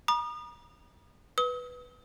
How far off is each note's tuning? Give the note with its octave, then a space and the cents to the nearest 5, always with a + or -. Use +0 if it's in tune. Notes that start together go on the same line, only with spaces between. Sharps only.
A#5 +45 D#6 -35
B4 +0 D#6 +40